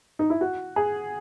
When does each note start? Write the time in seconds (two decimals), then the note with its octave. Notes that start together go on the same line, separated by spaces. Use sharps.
0.19 D#4
0.30 E4
0.41 F#4
0.76 G#4